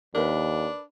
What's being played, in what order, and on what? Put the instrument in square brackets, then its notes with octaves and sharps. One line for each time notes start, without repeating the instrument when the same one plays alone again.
[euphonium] D#2 [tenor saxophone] D4 [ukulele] A#4 B4